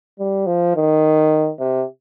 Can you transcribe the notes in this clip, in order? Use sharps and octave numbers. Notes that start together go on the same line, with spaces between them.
G3
F3
D#3
C3